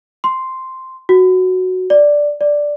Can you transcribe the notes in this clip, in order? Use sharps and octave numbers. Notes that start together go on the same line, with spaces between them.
C6
F#4
D5
D5